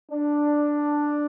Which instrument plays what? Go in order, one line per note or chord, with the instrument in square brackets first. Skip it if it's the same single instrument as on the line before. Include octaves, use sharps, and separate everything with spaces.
[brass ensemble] D4